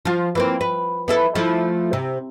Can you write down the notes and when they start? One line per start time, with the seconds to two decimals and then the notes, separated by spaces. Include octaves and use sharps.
0.05 F3 F4
0.35 E3 A#3 C4
0.61 B4
1.08 B3 E4 A4
1.35 F3 A3 E4
1.93 C3